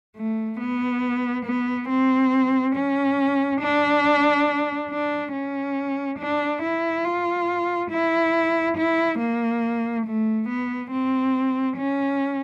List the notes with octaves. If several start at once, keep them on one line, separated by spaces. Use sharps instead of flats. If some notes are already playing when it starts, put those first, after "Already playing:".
A3
B3
B3
C4
C#4
D4
D4
C#4
D4
E4
F4
E4
E4
A#3
A3
B3
C4
C#4